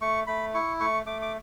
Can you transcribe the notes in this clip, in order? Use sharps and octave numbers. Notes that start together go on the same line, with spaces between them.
A3 C#6
A3 B5
E4 C#6
A3 C#6
A3 D6
D6